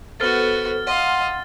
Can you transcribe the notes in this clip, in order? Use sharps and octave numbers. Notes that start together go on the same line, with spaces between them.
B3 F#4 A4 C5 F6 A6
D#5 F5 F#5 C6